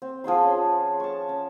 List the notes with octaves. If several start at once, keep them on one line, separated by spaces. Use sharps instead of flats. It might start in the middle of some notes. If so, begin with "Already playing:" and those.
C4
F3 G#4 F#5 C6
C#4
A5 C#6
C#4